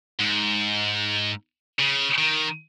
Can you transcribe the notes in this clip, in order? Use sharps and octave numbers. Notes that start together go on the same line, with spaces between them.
G#2
C#3
D#3